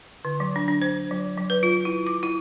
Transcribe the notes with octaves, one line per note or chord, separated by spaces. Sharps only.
D3
F#3
D4
D4
C5
F#3
F#3
B4
F4
E4
D6
E4